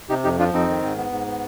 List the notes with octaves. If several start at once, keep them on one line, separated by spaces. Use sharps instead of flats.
C3 D#4 G4
F2 D#4 G4
F3 D4 F4
F2 C4 D#4
D#3
G#2
B3
G#2
B3